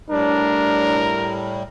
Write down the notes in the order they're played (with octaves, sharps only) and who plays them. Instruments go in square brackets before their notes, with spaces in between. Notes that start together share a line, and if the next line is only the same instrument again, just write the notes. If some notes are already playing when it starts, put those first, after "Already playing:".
[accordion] A2 G3 [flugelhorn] D4 [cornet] A#4